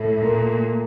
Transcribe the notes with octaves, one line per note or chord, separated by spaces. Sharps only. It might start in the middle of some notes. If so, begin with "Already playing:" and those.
Already playing: A2 A3
A#2 A#3